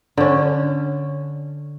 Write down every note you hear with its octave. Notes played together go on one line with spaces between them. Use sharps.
D3 C#4